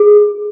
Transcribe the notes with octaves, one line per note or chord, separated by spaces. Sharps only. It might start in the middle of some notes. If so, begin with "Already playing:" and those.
Already playing: G#4